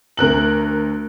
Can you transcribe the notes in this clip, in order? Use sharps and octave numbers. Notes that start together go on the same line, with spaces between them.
D2 A#4 F#6 F#7